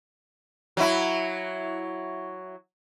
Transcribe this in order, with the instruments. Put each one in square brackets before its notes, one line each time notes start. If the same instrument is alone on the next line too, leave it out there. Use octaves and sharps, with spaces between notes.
[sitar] F#3 E4